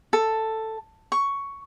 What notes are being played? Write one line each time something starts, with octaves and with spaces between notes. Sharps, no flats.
A4
C#6